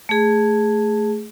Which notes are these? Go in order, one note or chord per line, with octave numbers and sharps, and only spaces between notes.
A3 G#4